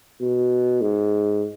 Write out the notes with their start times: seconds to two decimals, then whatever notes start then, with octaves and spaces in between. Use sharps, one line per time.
0.20 B2
0.81 G#2